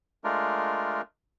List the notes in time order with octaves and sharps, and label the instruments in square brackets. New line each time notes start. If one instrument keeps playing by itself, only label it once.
[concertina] G#3 A3 D4 F4 A#4